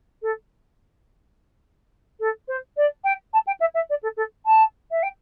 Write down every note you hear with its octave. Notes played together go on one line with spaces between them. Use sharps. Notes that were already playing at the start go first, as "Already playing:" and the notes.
A4
A4
C5
D5
G5
A5
G5
E5
E5
D5
A4
A4
A5
E5
G5